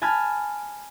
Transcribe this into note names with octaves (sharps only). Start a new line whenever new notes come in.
G#5 A5 B5 F6 G#6